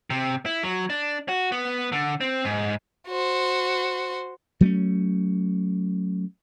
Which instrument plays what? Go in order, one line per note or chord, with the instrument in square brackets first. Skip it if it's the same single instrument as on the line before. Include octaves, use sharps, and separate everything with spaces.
[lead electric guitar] C3
E4
F#3
D4
F#4
B3
D3
C4
G#2
[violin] F#4 C5
[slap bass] F#3 A3 A#3 C#4